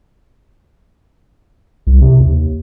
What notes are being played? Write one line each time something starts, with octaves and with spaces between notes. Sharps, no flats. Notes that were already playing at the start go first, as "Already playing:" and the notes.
C2
C3
D#2